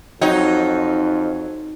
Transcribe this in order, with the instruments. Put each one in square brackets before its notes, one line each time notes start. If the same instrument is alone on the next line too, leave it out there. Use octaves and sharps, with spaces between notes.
[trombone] F2 [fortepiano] F#3 C#5 G5 [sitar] D#4